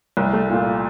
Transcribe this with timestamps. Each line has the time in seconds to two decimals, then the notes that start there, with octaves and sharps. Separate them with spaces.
0.17 C2
0.33 A3
0.50 A#2